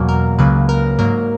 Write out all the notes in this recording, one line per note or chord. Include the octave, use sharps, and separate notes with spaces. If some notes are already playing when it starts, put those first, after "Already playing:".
Already playing: E2 B2 F#3 A#3 F#4
A#4
C#2 C#3 F#3 A#3 B4
A#4
G#2 F#3 A#3 A#4